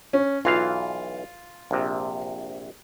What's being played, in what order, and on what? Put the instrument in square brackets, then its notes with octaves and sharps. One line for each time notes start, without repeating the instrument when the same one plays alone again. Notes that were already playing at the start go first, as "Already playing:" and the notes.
[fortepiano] C#4
[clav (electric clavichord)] B1 E3 F5 [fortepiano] F4
[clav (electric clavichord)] A#1 C3